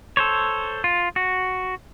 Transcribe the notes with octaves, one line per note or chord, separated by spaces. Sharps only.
A4 C5 C#5
F4
F#4